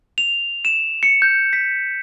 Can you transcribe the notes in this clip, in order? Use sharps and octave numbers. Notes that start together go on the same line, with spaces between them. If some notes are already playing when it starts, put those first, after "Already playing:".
F7
E7
C#7
G6
B6